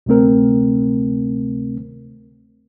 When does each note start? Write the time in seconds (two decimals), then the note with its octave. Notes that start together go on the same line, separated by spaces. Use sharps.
0.06 D2 C3 A3 C4 A#4